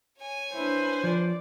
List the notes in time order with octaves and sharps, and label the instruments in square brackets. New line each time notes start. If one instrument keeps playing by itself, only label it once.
[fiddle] C#5 G#5
[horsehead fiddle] D4 E4 [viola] B4 C5
[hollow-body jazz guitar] F3 [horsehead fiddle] D5